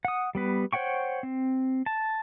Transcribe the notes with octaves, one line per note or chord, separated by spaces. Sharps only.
F#5 D#6
G3 B3 B4
C5 C#5 F#5 G5 C#6
C4
A5